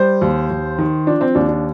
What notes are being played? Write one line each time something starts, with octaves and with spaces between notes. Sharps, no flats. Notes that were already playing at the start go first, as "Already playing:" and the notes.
Already playing: G3 C5
D#2
D#2
D#3
F3 D4
C4
D#2 D4
D4